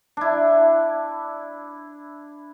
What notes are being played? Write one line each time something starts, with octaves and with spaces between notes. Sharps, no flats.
D4 E4